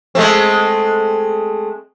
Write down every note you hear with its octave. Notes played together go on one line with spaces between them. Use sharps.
G#3 A3 C4